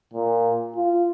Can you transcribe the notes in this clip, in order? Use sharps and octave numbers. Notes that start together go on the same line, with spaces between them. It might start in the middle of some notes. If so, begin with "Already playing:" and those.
A#2
F4